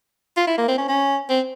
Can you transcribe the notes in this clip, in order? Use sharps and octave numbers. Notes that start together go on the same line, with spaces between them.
F4
E4
A#3
C4
C#4
C#4
C4